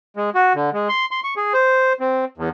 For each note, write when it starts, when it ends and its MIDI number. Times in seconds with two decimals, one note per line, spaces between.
0.17 0.30 56
0.35 0.53 66
0.55 0.70 50
0.73 0.88 56
0.89 1.05 84
1.11 1.20 84
1.24 1.34 85
1.37 1.53 68
1.54 1.93 72
2.00 2.25 60
2.38 2.49 40